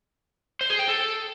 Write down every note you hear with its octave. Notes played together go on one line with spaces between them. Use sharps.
C5
G#4
G5
A4